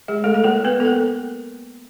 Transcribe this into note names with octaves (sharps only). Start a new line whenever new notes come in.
G#3 G#4
A3 A4
A4
A#3 A#4
B3 B4
A4
A#3 A#4